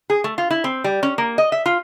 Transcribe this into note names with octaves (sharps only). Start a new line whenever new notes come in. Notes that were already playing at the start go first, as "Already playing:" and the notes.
G#4
A3
F4
E4
C4
G3
C#4
A#3
D#5
E5
F4